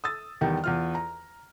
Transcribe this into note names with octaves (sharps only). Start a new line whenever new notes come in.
D#6 E6 A6
E2 D#3 G3
E2 F4 F6
A#5